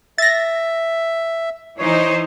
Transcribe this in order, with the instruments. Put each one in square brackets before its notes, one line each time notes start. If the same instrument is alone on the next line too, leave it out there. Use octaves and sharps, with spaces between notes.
[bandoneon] E5 [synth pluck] A6 A#6
[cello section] E3 D#4 C5 [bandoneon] C#5